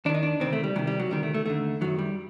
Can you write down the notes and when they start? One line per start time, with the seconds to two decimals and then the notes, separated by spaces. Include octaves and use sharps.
0.05 D#2 D4
0.09 D#3
0.14 D#4
0.23 D4
0.40 D2 C3 D#3 C4
0.53 A3
0.64 G3
0.76 C2 C3 D#3 F#3
0.87 G3
0.99 F#3
1.10 D2 C3 D#3 G3
1.23 A3
1.35 A3
1.46 D#2 D3 A3
1.81 F#2 D#3 F#3
1.99 G3